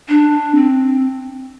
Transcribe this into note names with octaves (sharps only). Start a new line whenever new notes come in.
D4
C4